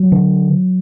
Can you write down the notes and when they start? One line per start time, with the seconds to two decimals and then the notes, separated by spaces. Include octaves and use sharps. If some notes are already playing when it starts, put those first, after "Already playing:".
Already playing: F#3
0.12 D3